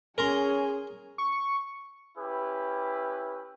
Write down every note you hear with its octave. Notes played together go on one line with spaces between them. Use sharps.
C#4 G#4 A#4 G#5 A#5 C6
C#6
C#4 E4 G4 B4